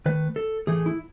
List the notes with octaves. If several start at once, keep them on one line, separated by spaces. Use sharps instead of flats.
D#3 A3 B4
A4
A2 E3 A3 G#4
E4